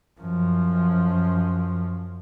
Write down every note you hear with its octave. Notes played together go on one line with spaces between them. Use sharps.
F#2 F3